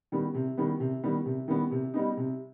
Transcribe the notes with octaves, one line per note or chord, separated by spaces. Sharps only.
D#3 G3 B3
C3
D#3 G3 B3
C3
D#3 G3 B3
C3
D#3 G3 B3
C3
G3 B3 D#4
C3